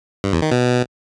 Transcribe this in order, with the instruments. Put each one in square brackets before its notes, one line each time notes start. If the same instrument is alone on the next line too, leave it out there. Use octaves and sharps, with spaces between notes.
[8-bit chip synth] G2
E2
D#3
B2